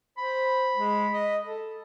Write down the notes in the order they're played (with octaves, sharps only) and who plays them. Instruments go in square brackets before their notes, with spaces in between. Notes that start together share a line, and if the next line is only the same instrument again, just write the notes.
[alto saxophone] C5 [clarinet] B5
[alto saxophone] G#3
D#5
A4